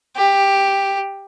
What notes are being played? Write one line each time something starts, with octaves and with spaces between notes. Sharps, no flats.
G4